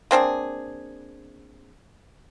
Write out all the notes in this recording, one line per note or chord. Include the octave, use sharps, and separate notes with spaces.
A#3 C4 D4 G#4